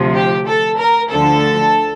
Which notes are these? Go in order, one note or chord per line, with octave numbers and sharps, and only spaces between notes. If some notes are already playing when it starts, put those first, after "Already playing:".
Already playing: D2 C3 F3
G4
A4
A#4
D2 D3 F3 A4